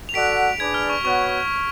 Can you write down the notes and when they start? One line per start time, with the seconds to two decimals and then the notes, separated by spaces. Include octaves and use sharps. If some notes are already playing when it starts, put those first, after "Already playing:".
0.09 F7
0.14 F#4 A4 D5 F#5 B6 D7
0.59 D4 G#4 B4 D5 G#6
0.74 F6
0.89 C#6
1.04 B3 F#4 C#5 F#5 C#6